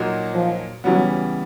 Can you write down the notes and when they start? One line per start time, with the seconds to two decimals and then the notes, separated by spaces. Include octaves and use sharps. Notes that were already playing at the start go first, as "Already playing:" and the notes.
Already playing: A#2 F#3 A#3 D#4 F#4
0.34 F3
0.84 C#3 E3 F#3 G3 B3